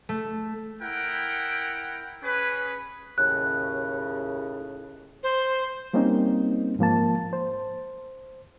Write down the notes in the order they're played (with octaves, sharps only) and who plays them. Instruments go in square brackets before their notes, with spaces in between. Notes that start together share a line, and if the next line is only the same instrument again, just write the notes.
[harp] A3
[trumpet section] E4 A#4 F#5 G5
C#4 G#4 B4
[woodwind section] D#2 A2 C#3 [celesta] F#6
[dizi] C5
[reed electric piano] G3 A#3 C4 C#4 D#4
G#2 F3 A#3 A5
C5